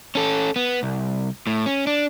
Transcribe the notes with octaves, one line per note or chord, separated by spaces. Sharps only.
C#4 A4
B3
C2
A2
C#4
D4